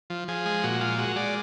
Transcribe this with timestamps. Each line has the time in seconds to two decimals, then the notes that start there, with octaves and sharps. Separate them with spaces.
0.10 F3
0.28 F3 G#4
0.46 G#3
0.64 A#2 F#4
0.81 G#3 F4
0.98 G#3 F#4
1.16 G#3 D5